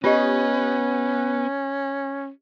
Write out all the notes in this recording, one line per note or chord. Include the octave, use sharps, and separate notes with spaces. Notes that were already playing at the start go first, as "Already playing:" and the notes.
B3 C#4 F4 G4 D#5